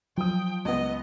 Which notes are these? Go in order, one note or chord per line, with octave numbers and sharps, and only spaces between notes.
F3 F#3 G5 D#6
C#2 B3 D#5